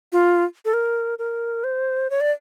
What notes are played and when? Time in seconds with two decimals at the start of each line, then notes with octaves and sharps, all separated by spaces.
0.12 F4
0.65 A4
0.73 A#4
1.19 A#4
1.64 C5
2.10 C#5
2.21 D5